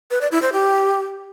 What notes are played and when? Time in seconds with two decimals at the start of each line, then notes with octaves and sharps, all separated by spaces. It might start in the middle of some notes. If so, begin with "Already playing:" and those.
0.11 B4
0.21 D5
0.32 E4
0.42 C5
0.53 G4